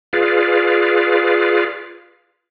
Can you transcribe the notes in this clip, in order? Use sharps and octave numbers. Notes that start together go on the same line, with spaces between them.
F4 G#4 B4 D5 F5